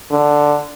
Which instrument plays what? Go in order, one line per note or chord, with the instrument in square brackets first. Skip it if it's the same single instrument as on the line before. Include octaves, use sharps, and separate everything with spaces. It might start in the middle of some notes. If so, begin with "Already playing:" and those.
[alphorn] D3